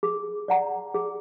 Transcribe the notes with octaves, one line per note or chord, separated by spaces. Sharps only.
G#4
D5 F#5 A#5
G#4